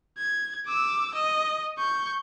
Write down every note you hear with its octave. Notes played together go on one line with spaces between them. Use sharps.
G#6
D6 E6
D#5
C#6 G6